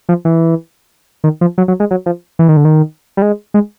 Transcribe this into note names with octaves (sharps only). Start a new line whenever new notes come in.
F3
E3
D#3
F3
F#3
F#3
G#3
F#3
F3
E3
D#3
D3
D#3
G3
G#3
G#3